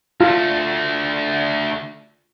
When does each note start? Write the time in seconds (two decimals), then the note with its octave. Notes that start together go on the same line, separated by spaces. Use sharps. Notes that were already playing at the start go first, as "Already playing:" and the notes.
0.21 D2 A3 F4